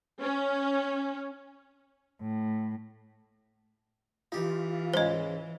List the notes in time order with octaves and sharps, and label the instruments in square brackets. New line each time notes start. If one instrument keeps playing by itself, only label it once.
[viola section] C#4
[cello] A2
[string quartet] E3 [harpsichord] D#4 G4 [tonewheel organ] F4
[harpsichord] C#2 G#2 [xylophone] C5 D#5